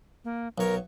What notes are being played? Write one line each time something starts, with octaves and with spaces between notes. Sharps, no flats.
A#3
B1 A#4 C#5